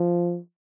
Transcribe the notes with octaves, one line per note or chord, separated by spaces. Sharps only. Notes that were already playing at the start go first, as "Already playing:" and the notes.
Already playing: F3